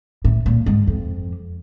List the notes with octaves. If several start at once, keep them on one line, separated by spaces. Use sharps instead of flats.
A2
A#2
G#2
F2